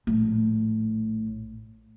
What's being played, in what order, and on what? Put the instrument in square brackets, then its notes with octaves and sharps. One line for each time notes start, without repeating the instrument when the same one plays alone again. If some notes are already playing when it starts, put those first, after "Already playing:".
[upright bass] A#1 A2